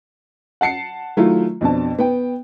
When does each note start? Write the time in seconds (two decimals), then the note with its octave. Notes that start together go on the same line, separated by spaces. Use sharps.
0.61 F#5 A5 C7 C#7
1.17 D#3 F#3 A3 E4 F4
1.61 F2 B2 D4 A5
1.99 B3 G5